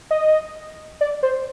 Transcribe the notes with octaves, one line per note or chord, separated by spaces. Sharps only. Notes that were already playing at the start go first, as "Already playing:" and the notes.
D#5
D5
C5